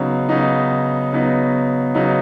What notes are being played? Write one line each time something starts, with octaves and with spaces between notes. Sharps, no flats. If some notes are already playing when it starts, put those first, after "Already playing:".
Already playing: C#3 F#3 B3 D#4
C#3 F#3 B3 D#4
C#3 F#3 B3 D#4
C#3 F#3 B3 D#4